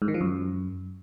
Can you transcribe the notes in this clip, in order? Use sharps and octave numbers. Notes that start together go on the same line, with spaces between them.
G#2
D#3
F3
F#2